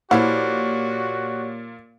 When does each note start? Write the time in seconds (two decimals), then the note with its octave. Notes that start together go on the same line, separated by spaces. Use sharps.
0.11 A#2 F3 E4 F#4 G4 C#5 D5 F#5